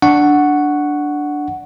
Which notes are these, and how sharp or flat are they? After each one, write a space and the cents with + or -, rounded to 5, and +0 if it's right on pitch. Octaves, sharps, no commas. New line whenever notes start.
D4 +0 F#5 +0 C#6 +0